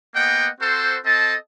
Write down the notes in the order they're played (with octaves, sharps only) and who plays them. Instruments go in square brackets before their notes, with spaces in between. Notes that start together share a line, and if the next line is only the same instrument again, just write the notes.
[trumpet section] A#3 B3 D#5 F#5 G5
C4 F#4 A4 C5
C4 A4 D#5 A5